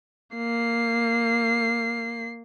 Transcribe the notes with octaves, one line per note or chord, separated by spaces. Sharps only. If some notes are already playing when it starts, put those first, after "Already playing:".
A#3 C7